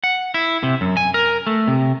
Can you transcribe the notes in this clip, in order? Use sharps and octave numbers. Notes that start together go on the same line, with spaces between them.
F#5
E4
C3
F#2
G#5
A#4
A3
C3